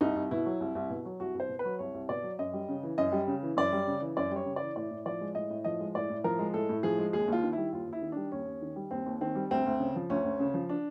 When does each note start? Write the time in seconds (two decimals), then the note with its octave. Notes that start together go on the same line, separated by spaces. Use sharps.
0.01 C2 D#4
0.16 C2
0.31 B2 E4
0.46 F#3
0.61 C2
0.75 C2
0.90 B2
1.05 F#3
1.20 C2 F#4
1.35 C2 C5
1.49 B2
1.59 B4
1.65 F#3
1.79 C2 C#5
1.94 C2
2.09 B2 D5
2.23 F#3
2.39 F#2 D#5
2.53 G3
2.69 C#3
2.83 E3
2.98 F#2 D#5
3.12 G3
3.27 C#3
3.43 E3
3.57 F#2 D5
3.72 G3
3.87 C#3
4.01 E3
4.17 F#2 D5
4.31 G3 C#5
4.46 C#3
4.56 E3 D5
4.76 A2 D5
4.91 A2
5.06 F3 D5
5.21 G#3
5.35 A2 D#5
5.50 A2
5.65 F3 D#5
5.80 G#3
5.95 A2 D5
6.10 A2
6.24 F3 A#4
6.39 G#3
6.54 A2 A4
6.69 A2
6.83 F3 G#4
6.98 G#3
7.13 D#2 G#4
7.28 D#2 F4
7.43 D#3
7.53 G3 E4
7.73 D#2 F4
7.87 D#2
7.93 E4
8.02 D#3
8.12 G3 D4
8.32 D#2 C#4
8.47 D#2
8.62 D#3
8.76 G3
8.91 D#2 C4
9.06 D#2
9.21 D#3 C4
9.35 G3
9.51 D2 C4
9.66 D2
9.80 C#3
9.96 F3
10.10 D2 C#4
10.24 D2
10.40 C#3
10.54 F3
10.69 D4